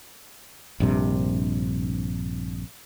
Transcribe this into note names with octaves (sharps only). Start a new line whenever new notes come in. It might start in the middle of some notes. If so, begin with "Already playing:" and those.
A#1 G2 C3